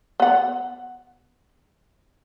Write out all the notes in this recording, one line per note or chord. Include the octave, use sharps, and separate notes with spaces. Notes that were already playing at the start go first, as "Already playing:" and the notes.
B3 F#5